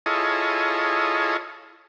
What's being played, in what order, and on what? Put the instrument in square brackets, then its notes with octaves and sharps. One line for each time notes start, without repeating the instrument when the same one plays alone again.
[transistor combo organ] E4 F4 G#4 A4 C#5 D#5